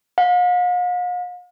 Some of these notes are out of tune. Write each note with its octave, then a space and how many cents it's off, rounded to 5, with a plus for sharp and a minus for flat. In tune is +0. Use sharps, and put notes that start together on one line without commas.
F5 +45